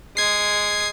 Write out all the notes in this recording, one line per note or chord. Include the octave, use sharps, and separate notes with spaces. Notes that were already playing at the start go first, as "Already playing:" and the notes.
G#3 D#6 G#6 C7